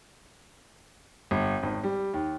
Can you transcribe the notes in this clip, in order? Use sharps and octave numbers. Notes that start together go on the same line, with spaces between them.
G1
G#1
G3
D#2